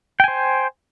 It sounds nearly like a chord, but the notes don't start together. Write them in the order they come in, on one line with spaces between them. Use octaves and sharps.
G5 G#5 C5